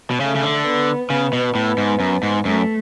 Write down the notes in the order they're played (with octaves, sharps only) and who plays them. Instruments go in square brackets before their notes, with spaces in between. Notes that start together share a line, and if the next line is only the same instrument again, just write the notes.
[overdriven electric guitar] B2
[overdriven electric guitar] C#3 [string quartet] A3
[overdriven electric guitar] C#3
D3
[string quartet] B3
[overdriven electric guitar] C#3 [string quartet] B3
[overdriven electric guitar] B2
A2
G#2
F#2
G#2
[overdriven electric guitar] F#2 [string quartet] A3